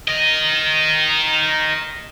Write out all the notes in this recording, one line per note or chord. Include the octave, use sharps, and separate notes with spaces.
A#4 D#5